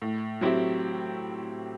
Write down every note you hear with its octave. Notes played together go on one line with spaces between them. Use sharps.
A2
F#3 C4 E4 G4